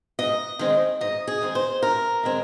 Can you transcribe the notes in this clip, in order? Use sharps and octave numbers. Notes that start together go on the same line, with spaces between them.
G#2 D#5
D#3 G#3 C4
G#2 D#5
G#4
D#3 G#3 C4
C5
G#2 A#4
D#3 G#3 C4